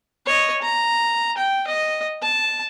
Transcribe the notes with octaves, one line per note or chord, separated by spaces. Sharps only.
C#5 D#5
A#5
G5
D#5
A5